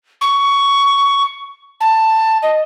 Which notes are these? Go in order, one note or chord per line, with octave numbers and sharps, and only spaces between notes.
C#6
A5
D#5